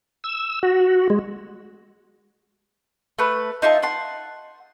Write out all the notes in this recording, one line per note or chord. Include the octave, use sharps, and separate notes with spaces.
E6
F#4
G#3
A3 B4
D#4 F4 E5 A5
F#5 A5 C6